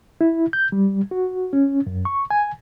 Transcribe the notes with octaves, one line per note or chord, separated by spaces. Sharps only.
E4
G6
G3
F#4
C#4
F#2
C#6
G#5